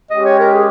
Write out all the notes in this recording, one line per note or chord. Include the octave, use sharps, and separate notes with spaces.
G#3 C#4 G4 D#5
C#5
A#4
G#4